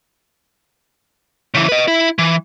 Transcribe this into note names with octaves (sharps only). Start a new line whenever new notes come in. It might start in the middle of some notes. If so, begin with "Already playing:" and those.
C#3 E3
B4 D#5
E4
E3